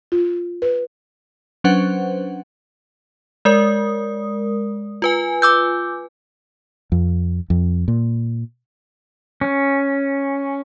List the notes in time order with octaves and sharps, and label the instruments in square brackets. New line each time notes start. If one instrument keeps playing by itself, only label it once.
[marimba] F4
B4
[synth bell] F#3 C#4 D4 B4 C5 F#5
[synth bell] G#3 A#4 D#6 [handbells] D5
[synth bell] F4 B4 G#5
[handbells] D6 E6 G6
[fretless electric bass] F2
F2
A#2
[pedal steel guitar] C#4